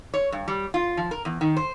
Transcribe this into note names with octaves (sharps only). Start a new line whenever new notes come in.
C#5
G2
G3
F4
F3
A#4
E2
D#3
C5